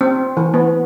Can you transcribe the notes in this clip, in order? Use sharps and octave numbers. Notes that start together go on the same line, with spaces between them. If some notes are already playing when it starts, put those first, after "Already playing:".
C4
E3
B3